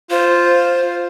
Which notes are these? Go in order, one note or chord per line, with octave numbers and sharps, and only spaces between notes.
F4 C5